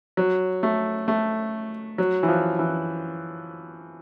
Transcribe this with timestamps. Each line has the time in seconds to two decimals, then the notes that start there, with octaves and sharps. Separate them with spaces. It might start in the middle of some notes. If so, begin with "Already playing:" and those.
0.17 F#3
0.63 A3
1.08 A3
1.98 F#3
2.23 E3
2.28 F3
2.59 E3